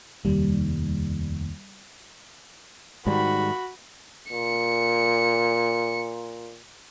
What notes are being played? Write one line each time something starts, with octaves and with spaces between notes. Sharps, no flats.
F1 D#2 G3
G#2 D#3 G3 F#4 B5
A#2 C#7